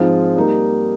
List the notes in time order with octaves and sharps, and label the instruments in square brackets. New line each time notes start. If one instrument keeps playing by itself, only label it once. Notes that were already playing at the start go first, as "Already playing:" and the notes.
Already playing: [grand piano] G#2 F3 G#3 C4 F4
G3 A#3 D#4 A#4